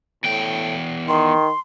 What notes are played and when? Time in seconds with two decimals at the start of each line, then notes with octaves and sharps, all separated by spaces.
0.24 E2 A2 G5
1.08 D#3 C6